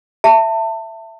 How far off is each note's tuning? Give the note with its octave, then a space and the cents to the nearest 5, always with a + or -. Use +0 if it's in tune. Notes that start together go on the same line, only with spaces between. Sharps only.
E5 +10 A5 +30